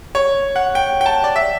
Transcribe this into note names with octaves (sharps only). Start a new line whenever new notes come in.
C#5
F#5
G5
G5
A5
D5
E5